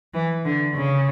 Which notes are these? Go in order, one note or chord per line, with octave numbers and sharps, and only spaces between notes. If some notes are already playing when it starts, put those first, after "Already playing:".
E3
D3
C#3